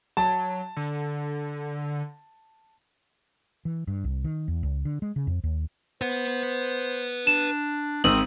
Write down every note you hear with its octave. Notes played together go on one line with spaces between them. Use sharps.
F#3 A5
D3
E3
G2
C2
D#3
E2
C#2
D3
G#3
C#3
F2
D#2
B4 C5 F#5
D4 E7
G#1 C4 D#6 E6 F#7